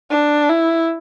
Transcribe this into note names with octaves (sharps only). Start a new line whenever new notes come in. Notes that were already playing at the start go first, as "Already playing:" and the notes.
D4
E4